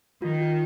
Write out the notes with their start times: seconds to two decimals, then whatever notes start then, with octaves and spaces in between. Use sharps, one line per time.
0.22 D#3 F4
0.40 F4